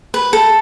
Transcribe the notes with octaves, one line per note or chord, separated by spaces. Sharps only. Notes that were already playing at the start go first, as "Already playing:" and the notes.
B4
A4